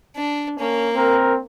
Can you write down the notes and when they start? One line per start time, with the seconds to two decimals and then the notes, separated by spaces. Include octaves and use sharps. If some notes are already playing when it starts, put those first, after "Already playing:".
0.16 D4
0.59 A#3 C#4
0.96 C4 A#4